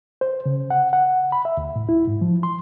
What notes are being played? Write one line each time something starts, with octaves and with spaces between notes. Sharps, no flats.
C5
C#3
F#5
F#5
B5
E5
D2
A2
E4
G#2
F3
C6